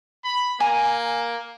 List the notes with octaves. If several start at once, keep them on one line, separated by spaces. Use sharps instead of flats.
B5
A#3 G#5 A#5